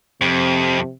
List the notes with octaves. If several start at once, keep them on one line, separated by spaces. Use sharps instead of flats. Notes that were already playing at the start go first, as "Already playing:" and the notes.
F2 C3